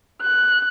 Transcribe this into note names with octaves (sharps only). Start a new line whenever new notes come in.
F#6